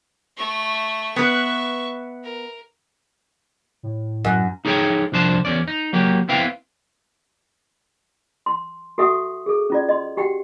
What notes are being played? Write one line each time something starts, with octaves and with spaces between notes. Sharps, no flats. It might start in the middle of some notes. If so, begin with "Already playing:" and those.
A3 C#6
B3 B4 E5 C#6
A#4
A2
F#2
D#4 G#4 A4 C#5 G5
C2 F2 D4 C5 A5
E2 C#4 D5
D#4
F#3 A#3 G4
B3 C4 E4 B4 F5 G5
C6
F#4 A4 E5 F#5 C#6 D#6
G#4 A4
C#4 F4 D5
D#5 C6
F#4 G4 F#5 G5